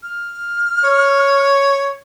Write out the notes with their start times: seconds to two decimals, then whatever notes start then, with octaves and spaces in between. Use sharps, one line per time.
0.03 F6
0.84 C#5